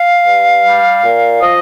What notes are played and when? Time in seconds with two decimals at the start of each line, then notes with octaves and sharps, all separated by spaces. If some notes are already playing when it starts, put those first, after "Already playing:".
Already playing: F5
0.26 G2
0.64 G3
1.04 A#2
1.42 F3 D#5